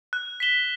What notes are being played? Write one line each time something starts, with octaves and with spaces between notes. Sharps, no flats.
F#6
B6 E7 G7